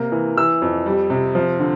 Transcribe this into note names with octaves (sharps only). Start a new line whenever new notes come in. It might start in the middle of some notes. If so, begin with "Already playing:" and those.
Already playing: C3 A#3
E3
E3 E6
F2
G3
C3
F3
D3